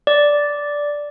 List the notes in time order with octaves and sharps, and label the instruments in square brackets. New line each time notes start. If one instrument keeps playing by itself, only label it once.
[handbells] D5